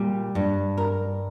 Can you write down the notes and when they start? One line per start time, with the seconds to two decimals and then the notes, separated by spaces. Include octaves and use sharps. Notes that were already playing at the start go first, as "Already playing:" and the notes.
Already playing: A#2 G3
0.35 G2
0.78 A#4